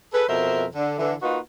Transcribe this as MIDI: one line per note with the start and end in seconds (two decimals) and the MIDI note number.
0.14 0.23 68
0.14 0.23 69
0.14 0.23 71
0.28 0.64 41
0.28 0.64 47
0.28 0.64 70
0.28 0.64 72
0.28 0.64 76
0.75 0.97 50
0.99 1.13 50
0.99 1.13 52
1.22 1.38 58
1.22 1.38 63
1.22 1.38 65
1.22 1.38 66
1.22 1.38 71